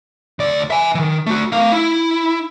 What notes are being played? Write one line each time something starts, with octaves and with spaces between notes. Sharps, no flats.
D2 D5
E5 G#5
D#3 E3
A3 F#4
A3 F5
E4